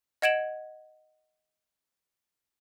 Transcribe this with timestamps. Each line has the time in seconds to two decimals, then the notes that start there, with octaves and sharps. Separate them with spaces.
0.22 D#5 F#5 G#6 D7 E7 F#7